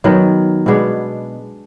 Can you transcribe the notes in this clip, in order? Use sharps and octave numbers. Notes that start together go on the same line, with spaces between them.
D#3 F#3 B3
B2 G#3 B3 D4